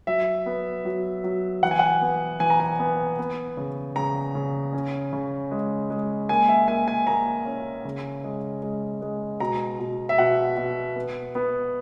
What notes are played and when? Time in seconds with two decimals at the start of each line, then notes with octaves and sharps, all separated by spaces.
0.07 F#3 E5
0.46 B3
0.85 F#3
1.24 F#3
1.63 E3 F#5
1.71 G#5
1.79 F#5
2.02 B3
2.40 E3 G#5
2.50 A#5
2.60 G#5
2.79 B3
3.19 B3
3.57 C#3
3.96 C#3 A#5
4.35 C#3
4.73 C#4
5.13 C#3
5.51 G#3
5.90 G#3
6.29 A#3 G#5
6.49 E5
6.68 A#3 G#5
6.88 G#5
7.07 A#3 A#5
7.46 C#4
7.85 C#3
8.24 G#3
8.62 G#3
9.02 G#3
9.40 B2 A#5
9.79 B2
10.09 E5
10.18 B2 F#5
10.57 B2
10.96 B3
11.35 B3